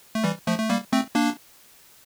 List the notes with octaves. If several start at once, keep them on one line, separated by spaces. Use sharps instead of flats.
A3
E3 G3
F3 A3
A3
G3 A#3
A3 C4
A#3 D4